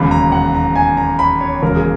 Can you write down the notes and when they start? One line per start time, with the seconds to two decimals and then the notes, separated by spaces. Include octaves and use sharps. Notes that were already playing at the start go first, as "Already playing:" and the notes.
Already playing: E1 D#2 C#3 F#3 B5
0.11 A#5
0.32 F#5
0.54 A#5
0.76 G#5
0.97 A#5
1.19 B5
1.41 C#5
1.62 E1 D#2 C#3 F#3 A#4
1.76 G#4